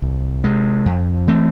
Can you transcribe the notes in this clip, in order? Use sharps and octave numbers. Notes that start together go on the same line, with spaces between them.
C2
C3 G#3
F2
E3 A3 C4